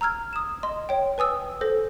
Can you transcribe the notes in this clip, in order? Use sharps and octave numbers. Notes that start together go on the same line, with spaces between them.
A#5 E6 F6 G#6
D#6 E7
D#5 C6
C#5 G5
B4 G#5 D#6 E6
A4 C5 A#6